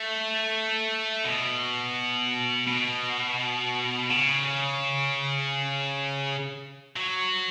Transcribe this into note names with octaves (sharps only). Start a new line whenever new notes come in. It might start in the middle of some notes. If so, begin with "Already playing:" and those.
Already playing: A3
B2
B2
C#3
F#3